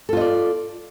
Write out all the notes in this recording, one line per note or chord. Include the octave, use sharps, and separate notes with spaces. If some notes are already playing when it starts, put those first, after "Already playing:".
F4 A4 D5 D#5